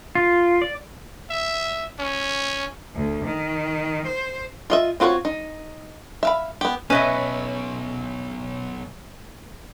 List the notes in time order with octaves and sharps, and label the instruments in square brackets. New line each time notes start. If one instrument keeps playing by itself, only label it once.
[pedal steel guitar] F4
D5
[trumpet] E5
C#4
[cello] D2
D#3
C5
[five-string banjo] F4 D#5 E5
C4 F4 F#4 C5 C#5
D#4
E5 F5 B5
B3 G4
[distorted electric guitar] B1 [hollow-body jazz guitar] C#4 [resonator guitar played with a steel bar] B4 D#5 E5